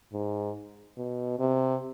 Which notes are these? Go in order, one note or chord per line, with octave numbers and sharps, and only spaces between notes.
G#2
B2
C3